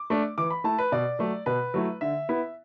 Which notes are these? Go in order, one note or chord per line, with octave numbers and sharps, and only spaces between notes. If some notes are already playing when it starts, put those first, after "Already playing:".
Already playing: D6
A3 D4
E3 D6
B5
A3 E4 A5
B4
B2 D5
F#3 A3
B2 B4
F#3 A3 E4
D3 E5
B3 E4